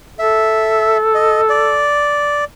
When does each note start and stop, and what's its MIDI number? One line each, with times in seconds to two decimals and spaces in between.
0.19 1.86 69
0.19 0.97 76
1.15 1.41 75
1.49 2.44 74